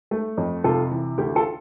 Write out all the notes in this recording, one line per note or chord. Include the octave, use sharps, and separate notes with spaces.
A3
F2
C3 F4 A4
E3
D2 G4
F4 A4